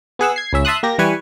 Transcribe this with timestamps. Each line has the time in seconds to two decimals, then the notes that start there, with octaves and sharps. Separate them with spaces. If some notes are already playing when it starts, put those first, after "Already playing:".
0.19 B3 G#4 F#5 E6
0.36 G#6 C7
0.53 C#2 C#4 E5
0.65 E5 A5 C6 D#6 F#6
0.83 A#3 G4 A#6
0.98 E3 G3 B4 G#5 C#6